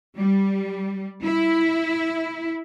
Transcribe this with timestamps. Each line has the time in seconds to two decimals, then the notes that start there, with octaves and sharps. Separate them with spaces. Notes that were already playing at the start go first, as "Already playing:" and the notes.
0.17 G3
1.23 E4